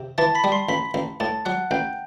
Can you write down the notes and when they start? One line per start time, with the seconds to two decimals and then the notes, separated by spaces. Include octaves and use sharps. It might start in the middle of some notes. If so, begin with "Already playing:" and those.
Already playing: C3
0.18 E3 A5 A6
0.35 B5 B6
0.44 G3
0.52 C6 C7
0.69 A1 B5 B6
0.94 A1
1.20 A2 A5 A6
1.45 F#3 F#5 F#6
1.71 A1 G5 G6